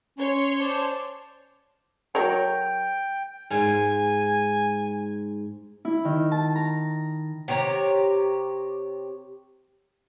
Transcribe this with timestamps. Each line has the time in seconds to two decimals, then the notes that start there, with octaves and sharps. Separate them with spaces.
0.17 C#4 C#5 C6
0.60 C5 D5 A5
2.15 F#3 A#4 C#5 G5
3.50 G#2 G#5
5.85 E4
6.05 D#3
6.31 A5
6.55 A#5
7.48 C3 G4 C#5 A#5